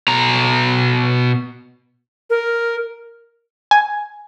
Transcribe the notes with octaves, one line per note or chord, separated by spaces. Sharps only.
B2 A#5
A#4
G#5